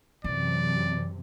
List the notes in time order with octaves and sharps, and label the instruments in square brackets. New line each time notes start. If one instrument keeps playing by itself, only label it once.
[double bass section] F#2 C3 [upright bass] E3 [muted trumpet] D5